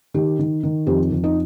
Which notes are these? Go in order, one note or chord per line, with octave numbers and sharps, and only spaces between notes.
D#3 G4
D#3
D#3
F2 G4
F2
D#4